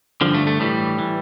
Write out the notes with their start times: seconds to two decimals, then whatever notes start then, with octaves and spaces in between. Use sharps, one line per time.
0.21 G2 D3 F3
0.34 A3
0.47 A3
0.60 A2 E3 G3
0.99 E3